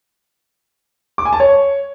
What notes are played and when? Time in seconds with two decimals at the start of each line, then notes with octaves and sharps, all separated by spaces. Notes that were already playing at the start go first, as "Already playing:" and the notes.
1.18 D6
1.25 G#5
1.33 A5
1.40 C#5